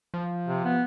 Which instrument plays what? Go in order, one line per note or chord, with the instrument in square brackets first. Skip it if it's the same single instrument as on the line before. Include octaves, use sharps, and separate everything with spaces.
[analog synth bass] F3
[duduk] C3
B3